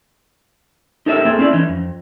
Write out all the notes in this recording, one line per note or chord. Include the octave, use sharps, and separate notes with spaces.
D#4 G4 A4 A#4 C#5 E5
A#3 C4 G#4 A4
C4 C#4 E4 D5
E3 C#4 D#4
F2